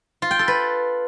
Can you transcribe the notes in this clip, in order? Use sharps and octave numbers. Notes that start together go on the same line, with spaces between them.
F4
G5
A4
B4